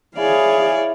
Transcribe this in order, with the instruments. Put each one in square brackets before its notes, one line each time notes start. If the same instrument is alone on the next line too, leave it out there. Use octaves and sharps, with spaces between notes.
[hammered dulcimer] E4 [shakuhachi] G#4 [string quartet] C#5 D5 [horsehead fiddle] F5 G#5